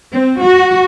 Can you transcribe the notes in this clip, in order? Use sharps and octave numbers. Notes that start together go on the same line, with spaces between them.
C4
F#4